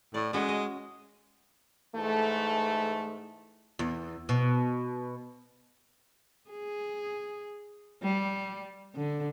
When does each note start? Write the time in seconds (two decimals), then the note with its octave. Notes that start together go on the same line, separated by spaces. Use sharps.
0.14 A2 D5
0.33 G#3 C#4 F#4
0.49 D#5
1.95 G#2 E3 A3
3.79 E2
4.29 B2
6.51 G#4
8.03 G3
8.95 D3